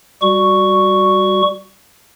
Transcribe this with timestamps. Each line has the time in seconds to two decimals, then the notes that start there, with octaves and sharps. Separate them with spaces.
0.22 G3 F#4 C#6